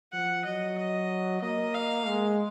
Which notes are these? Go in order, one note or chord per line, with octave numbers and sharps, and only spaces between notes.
F3 F#5
F#3 D#5
D#5
A#3 D#5
F5
G#3